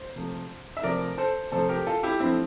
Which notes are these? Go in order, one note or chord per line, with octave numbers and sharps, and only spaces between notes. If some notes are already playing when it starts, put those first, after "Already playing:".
Already playing: C5
C3 F3 A3
E5
C3 F3 A3 A#4 D5
A4 C5
C3 F3 A3 A4 C5
G4 A#4
F4 A4
E4 G4
G2 F3 A3 C4 E4